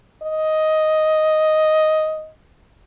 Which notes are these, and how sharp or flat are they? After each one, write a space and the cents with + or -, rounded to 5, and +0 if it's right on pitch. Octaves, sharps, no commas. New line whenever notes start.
D#5 +5